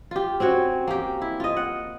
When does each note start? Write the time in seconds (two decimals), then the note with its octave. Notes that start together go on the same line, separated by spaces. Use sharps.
0.11 F4 G4
0.40 C4 C#4 F#4 C#5
0.87 A#3 G4
1.22 E4
1.40 F4 D#5
1.56 F#5